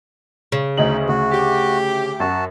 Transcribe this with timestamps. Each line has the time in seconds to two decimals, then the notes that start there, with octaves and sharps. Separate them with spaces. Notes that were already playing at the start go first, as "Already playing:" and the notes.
0.52 C#3
0.77 D2 D#4 D#5 F#7
1.09 D2 F#4
1.32 G4
2.20 F#2 F#4 A5